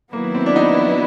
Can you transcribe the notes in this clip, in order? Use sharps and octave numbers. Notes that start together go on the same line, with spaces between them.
D#3 F#3 A#3 B3 E4
C4
D4
D#4